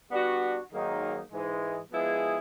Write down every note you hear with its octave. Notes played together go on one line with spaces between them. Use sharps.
G3 B3 D4 F#4
G#2 D#3 F#3 A#3 D#4
G#2 E3 G#3
F3 G#3 B3 E4 G#4